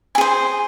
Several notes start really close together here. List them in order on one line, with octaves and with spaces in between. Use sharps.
G#5 G#4 C5